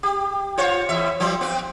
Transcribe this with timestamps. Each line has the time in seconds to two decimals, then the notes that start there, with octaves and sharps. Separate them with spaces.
0.03 G4
0.58 F4 C5 C#5
0.89 E2 E5
1.20 F3 F#3 C5
1.41 B3 C4